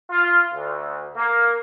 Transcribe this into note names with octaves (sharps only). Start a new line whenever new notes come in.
F4
D2
A#3